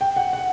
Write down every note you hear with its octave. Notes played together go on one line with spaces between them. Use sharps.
G5
F#5
F#5